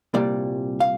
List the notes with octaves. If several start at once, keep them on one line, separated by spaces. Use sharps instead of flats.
C2 A#2 G3 D5
F5